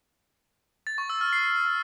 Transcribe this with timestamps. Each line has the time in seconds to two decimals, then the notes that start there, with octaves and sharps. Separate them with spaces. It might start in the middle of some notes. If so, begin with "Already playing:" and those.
0.87 A6
0.98 C#6
1.10 E6
1.21 F6
1.33 C7